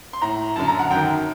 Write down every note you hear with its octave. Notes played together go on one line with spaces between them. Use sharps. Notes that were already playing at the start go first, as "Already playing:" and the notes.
C6
A2 A#5
F#2 D3 A5
A#5
F#5
F#2 D#3 G5